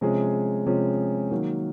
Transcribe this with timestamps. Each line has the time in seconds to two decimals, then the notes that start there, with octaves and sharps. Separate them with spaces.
0.01 C3 F3 G#3 C#4 G#4
0.66 C3 F3 G#3 C#4 G#4
1.31 D#3 F#3 A#3